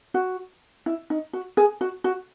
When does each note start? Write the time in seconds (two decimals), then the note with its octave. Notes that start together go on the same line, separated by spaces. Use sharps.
0.14 F#4
0.86 E4
1.10 D#4
1.33 F#4
1.57 G#4
1.81 F#4
2.04 F#4